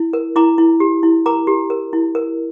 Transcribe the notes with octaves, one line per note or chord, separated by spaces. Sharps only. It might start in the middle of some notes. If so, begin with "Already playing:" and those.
Already playing: E4
A#4
E4 A#5 D6
E4
G4
E4
A#4 A#5 D6
G4
A#4
E4
A#4